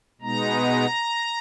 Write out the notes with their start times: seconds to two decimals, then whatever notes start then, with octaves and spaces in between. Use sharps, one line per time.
0.21 B2 G#3 B3 D#4 A#5